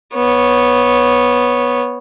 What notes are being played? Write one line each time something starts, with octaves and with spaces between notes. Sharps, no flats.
B3 C#5